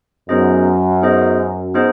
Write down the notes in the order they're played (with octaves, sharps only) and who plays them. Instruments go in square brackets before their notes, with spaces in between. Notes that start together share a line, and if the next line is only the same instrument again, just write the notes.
[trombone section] F#2 [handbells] B3 D#4 G#4 C5 D#5
[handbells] B3 D#4 G#4 C5 D#5
B3 D#4 G#4 C5 D#5